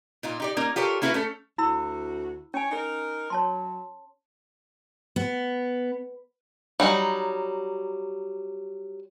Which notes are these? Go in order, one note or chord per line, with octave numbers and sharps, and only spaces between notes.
A#2 D#4 F4
D#4 G4 D5
A#3 C#4 D#4 A#4
F4 G4 A4 A#4 C#5
A#3 C#4 E4 F#4 A#4 B4
A3 C#4 A4
D2 E4 F#4 B5 E6
C#4 C#5 G#5
D#4 A#4
F#3 C#5 A5 C6
B3
F#3 G3 D#4